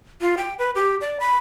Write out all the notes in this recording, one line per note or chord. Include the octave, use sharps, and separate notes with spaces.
F4
G5
B4
G4
D5
B5